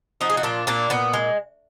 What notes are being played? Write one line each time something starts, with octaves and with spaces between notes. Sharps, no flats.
F3 D#4 F#4
G#4
F#4
A#2 D4 F4
A#2 A#3 D4
A#2 B3
G#3